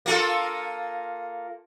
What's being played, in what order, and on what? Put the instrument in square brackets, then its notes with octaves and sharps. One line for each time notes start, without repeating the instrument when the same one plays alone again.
[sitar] A#3 F4 A4